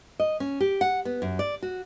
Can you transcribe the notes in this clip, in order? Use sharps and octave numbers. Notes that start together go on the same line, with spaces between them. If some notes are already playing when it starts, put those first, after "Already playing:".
D#5
C#4
G4
F#5
B3
F#2
D5
F#4